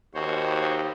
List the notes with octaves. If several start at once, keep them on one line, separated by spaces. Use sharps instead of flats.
D#2 F#4 C5 C#5